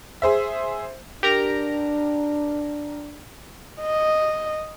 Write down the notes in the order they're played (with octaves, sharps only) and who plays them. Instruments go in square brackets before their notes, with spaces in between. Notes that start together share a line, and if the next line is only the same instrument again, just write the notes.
[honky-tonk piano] G#4 C5 E5
[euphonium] D4 [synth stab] G4 A#4 A#5
[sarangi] D#5